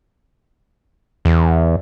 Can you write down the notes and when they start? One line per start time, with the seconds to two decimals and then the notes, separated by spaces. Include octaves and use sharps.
1.25 E2